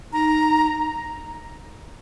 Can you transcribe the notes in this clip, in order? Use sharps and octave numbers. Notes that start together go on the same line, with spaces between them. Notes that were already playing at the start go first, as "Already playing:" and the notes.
D#4 A#5